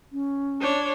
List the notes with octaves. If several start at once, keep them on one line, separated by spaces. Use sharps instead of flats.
C#4
D4 C#5